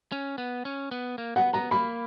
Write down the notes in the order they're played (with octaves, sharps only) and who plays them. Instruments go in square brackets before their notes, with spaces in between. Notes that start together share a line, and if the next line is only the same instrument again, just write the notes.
[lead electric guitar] C#4
B3
C#4
B3
A#3
[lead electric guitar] B3 [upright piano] F#5
[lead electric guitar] B3 [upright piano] A#5
[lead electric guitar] A#3 [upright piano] B5